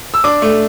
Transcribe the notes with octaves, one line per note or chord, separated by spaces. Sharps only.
E6
D4 D6
A3